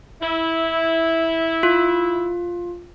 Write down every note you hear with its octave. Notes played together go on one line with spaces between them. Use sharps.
E4
F4